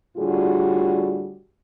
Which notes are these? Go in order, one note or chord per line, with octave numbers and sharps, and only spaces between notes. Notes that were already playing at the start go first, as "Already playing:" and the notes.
A2 D3 G3 F4 F#4 G#4